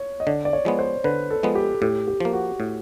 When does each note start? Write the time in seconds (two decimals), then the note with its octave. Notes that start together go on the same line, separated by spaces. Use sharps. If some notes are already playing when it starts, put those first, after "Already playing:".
Already playing: C#5
0.20 D#5
0.27 D3 D5
0.45 D5
0.53 C#5
0.65 F3 G#3 B3
0.79 C5
1.04 D3 B4
1.31 A4
1.43 F3 G#3 B3
1.55 G4
1.82 A2 G4
2.08 G4
2.20 F3 A#3
2.33 F#4
2.60 A2